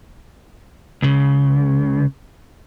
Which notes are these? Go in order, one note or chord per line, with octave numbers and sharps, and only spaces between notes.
C#2 C#3